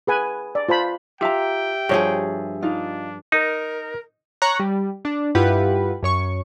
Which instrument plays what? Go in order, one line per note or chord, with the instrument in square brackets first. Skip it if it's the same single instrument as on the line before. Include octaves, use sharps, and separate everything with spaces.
[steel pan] G#4 B4 G#5
D5
F4 C5 A5 B5
[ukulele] F4 A#5 [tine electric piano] G4 E5 [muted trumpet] G5
[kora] G2 F3 G#4 [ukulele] F#4 C#5
[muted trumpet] D4 [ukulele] D#4 F4
[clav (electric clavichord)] D#4 [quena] A#4
[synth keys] C#5 A#5 C#6 F#6
G3
D4
G2 E4 F4 G4 B4 F#5
F#2 C#5 C#6